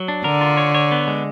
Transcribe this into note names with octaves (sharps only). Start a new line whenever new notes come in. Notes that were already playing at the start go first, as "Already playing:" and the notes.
Already playing: F#3
D4
D3 A#4
F4
C#5
C#5
B3
G#3